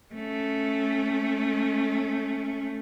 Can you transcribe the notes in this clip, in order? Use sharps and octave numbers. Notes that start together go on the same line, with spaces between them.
A3 C#4